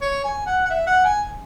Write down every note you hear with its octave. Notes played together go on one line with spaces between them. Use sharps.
C#5
G#5
F#5
F#5
E5
F#5
G#5